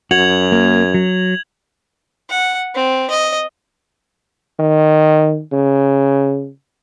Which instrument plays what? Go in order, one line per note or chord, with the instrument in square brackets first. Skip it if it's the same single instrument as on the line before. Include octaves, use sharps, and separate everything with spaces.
[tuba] F#2 [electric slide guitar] F#4 [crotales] G#6 F7 F#7
[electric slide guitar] A#3
F#3
[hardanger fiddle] F#5
C4
D#5
[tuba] D#3
C#3